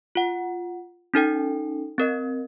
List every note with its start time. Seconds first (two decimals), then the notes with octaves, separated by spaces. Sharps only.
0.15 F4 F#5
1.14 C#4 D#4 A4 G5
1.98 C4 A#4 D#5